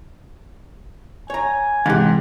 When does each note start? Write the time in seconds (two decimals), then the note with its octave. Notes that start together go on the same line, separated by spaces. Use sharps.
1.30 C#5 G#5 A#5
1.86 G#2 C3 E3 G4